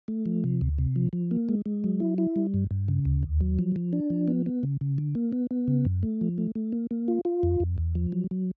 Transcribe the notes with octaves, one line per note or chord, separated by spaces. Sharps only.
A3
F3
C3
D2
C3
F3
F3
A#3
G#3
G#3
F#3
E4
E4
G3
G2
G2
C#3
D2
D#2
F#3
F3
F3
D4
F3
B3
B3
C#3
C#3
D3
A#3
B3
B3
C#3
F#2
A3
F3
A3
A3
A#3
A#3
F4
F4
F2
F2
E2
F3
F#3
F#3